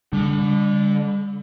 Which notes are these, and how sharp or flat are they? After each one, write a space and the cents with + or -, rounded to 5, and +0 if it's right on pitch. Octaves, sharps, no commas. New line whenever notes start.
D3 -20 G3 +40